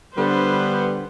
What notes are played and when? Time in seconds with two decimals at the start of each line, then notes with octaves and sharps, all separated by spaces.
0.17 D3 G3 B3 B4 C5